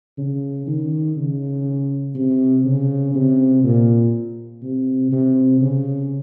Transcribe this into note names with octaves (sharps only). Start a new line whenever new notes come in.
C#3
D#3
C#3
C3
C#3
C3
A#2
C3
C3
C#3